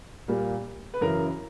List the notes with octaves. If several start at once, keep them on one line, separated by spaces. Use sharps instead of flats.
A#2 G3 A#3
B4
F#2 C#3 E3 A#4